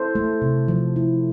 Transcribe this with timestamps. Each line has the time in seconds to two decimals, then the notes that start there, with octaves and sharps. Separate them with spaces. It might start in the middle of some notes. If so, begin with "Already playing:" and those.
Already playing: E4 A4 C5
0.15 A3
0.42 C3
0.68 F3
0.96 E4